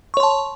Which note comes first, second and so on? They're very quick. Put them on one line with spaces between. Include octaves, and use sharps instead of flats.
C#6 C#5 C6 A5